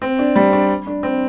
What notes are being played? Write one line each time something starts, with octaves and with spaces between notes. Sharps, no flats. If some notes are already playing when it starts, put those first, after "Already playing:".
C4
D4
G3
D4
D4
C4